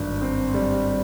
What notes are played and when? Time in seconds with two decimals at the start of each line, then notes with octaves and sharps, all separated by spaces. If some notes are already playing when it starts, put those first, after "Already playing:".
Already playing: G#1 G2
0.22 C4
0.54 G3